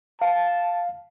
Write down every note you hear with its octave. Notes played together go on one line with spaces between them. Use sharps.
F5 A5